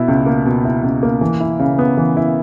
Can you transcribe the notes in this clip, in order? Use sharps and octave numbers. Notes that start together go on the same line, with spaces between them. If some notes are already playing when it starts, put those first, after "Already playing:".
Already playing: B2 E4
C#2
A#3
B2
E4
C#2
A#3
E3
E4
C#3
B3
E3
E4